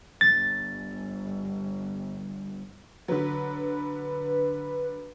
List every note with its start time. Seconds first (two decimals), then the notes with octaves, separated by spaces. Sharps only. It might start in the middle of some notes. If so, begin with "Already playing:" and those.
0.21 G1 A6
3.08 D3 F#3 B4